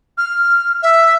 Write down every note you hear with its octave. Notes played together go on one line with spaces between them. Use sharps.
F6
E5